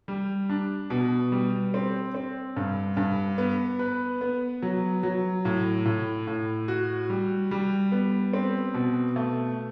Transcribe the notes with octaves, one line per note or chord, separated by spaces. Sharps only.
G3
D4
B2
G3
C4
C4
G2
G2
B3
B4
B3
F#3
F#3
A2
A2
A2
F#4
G3
G3
B3
C4
B2
A3